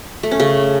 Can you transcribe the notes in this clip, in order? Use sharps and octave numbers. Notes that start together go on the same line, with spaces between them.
A3
C#4
C#3